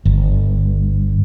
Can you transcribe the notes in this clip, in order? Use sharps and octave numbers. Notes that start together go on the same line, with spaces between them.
G1